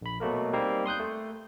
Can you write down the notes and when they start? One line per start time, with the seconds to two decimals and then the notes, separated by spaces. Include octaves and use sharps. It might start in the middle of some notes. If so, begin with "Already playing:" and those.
0.02 A#1 B5
0.20 B2 F#3 A3 A#3 A#4
0.53 G3 A#3 C4 D#4
0.86 C6 D#6 F#6 G6
1.00 A3